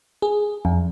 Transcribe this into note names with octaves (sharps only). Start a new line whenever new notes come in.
G#4
F2